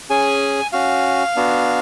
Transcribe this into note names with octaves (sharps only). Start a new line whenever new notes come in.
C#4 G#4 G#5
C#4 F#4 F5
B3 D4 F#4